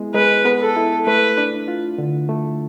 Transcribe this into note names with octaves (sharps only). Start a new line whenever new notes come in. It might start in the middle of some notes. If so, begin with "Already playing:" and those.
Already playing: G#3 B3 E4
G#3 B4
B3
A4
E4
A3 B4
D4
F4
D3
A3